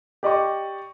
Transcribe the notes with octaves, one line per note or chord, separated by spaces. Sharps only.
G4 D5 D#5 C#6